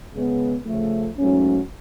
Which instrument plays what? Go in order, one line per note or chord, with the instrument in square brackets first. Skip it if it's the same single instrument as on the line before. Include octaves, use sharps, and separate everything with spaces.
[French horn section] C#3 G#3 B3
C#3 F3 A3
G#2 F#3 A3 C#4